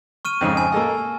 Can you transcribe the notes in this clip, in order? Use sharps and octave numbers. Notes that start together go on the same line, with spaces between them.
C#6 F6 D#7
F2 G#2 C#3
G#5
A#3 A4 D#5